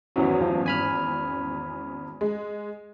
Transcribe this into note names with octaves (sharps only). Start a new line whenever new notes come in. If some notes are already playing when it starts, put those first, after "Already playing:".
G#1 E2 E3 F#3 C#4
G2 F3
G#5 B5 F6
G#3